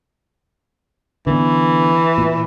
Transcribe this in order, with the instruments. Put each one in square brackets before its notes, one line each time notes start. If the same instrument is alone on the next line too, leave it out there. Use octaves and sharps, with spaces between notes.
[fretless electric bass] D3 B3 [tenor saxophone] E3
[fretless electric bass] A#2